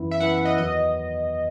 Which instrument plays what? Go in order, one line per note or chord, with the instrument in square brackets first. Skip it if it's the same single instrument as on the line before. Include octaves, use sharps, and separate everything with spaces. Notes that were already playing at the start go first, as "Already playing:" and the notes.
Already playing: [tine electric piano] F#2 E3 B3 E4
[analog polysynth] E5
[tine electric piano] F#2 E3 B3 E4 [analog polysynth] F#5
[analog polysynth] E5
D#5
[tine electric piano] E2 D#3 F#3 B3 [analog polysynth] D#5